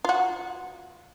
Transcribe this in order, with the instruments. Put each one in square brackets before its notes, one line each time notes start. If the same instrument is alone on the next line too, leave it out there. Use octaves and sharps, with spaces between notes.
[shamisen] F4 F#4